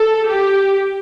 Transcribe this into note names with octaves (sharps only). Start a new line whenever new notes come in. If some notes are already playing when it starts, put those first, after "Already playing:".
Already playing: A4
G4